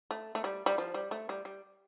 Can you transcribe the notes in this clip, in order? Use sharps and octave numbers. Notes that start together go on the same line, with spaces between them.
A3
A3
G3
G3
F3
G3
A3
G3
G3